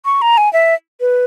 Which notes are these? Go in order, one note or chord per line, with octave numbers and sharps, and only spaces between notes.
C#6
A#5
G#5
E5
B4